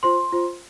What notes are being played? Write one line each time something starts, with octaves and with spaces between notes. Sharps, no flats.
F4 C5 C6
F4 C5